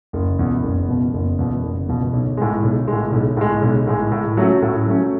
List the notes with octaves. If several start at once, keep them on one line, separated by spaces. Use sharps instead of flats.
F#1
E2 B2
F#1
E2 B2
F#1
E2 B2
F#1
E2 B2
B1
A2 G#3
B1
A2 G#3
B1
A2 G#3
B1
A2 G#3
A2
F#3 A3 C#4 F#4
A2
F#3 A3 C#4 F#4